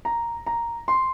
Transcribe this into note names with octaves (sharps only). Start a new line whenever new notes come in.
A#5
A#5
C6